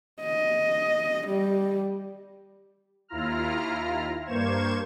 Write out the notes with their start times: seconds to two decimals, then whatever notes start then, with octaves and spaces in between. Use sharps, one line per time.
0.21 D#5
1.28 G3
3.08 D#2 E4 F4 A#5 F6
4.26 G2 A#3 C5 C#6 G#6 E7